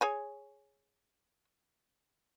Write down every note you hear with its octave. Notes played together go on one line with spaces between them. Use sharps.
G#4 C#5 G#5